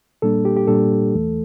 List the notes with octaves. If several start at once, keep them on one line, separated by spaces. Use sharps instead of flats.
A#2 G3 A#3 D4 A4
G4
G4
A#2 G3 A#3 D4 A4
E2 E3 A3